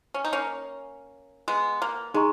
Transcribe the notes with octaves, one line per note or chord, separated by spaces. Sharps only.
C#4
D#4
A#3 C#4
G#3 B3
A#3
G#3 D#4 G#4 D#5 A#5 C#6